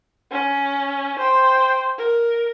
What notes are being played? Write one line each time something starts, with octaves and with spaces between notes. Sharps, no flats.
C#4
C5 G5
A#4